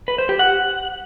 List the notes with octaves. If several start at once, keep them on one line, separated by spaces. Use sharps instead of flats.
B4
C5
G4
F#5